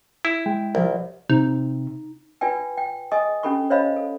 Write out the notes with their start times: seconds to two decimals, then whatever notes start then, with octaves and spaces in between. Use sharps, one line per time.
0.25 E4
0.46 G#3 G5
0.75 C2 F3 A#4
1.30 C3 D#4
2.41 F4 B4 D5 G5 G#5
2.77 G5
3.12 G#4 D#5 G#5 C#6 D#6
3.43 C#4 G4 A4 B5 C#6
3.70 C5 C#5 D#5 F5 B5
3.96 A4